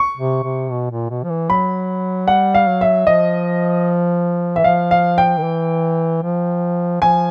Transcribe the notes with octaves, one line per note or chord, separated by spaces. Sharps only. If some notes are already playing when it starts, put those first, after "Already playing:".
Already playing: C#6
C3
C3
B2
A#2
B2
F3
E3
F#3 B5
G3 F#5
F5
F#3
E5
F3 D#5
E3 E5
F3 F5
F5
G5
D#3
E3
F3
F3 G#5